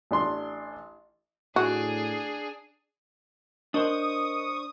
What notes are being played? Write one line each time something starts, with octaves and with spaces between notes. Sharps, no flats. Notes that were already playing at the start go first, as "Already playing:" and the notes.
A1 D4 C6
A2 D4 F#4 G#4
D4 A#4 C5 D#5 C#6 D#6